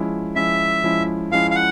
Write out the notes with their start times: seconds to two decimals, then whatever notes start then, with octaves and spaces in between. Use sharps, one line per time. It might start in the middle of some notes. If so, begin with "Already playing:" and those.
Already playing: F3 G#3 C#4 E4
0.36 F3 G#3 C#4 E4 E5
0.84 F3 G#3 C#4 E4
1.31 F3 G#3 C#4 E4 F5
1.51 F5
1.55 F#5